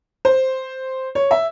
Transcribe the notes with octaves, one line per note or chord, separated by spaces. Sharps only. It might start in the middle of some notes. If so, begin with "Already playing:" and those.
C5
C#5
E5